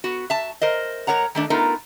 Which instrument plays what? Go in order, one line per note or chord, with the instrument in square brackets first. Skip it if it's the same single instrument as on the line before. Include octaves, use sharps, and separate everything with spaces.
[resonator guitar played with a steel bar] B3 F#4
E5 A5
A#4 C5 D#5
G#2 A#4 C#5 F#5 A#5
D#3 A3 D4
A3 B3 D#4 F4 A#4